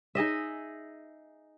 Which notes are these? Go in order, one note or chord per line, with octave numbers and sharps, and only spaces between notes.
D#4 G#4 D#5 E5